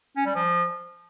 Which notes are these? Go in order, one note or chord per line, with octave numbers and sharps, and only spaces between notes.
C#4
G3
F3